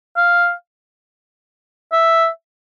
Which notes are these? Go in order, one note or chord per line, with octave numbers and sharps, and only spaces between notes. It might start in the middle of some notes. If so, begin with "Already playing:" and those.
F5
E5